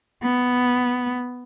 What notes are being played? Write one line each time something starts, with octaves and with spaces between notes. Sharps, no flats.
B3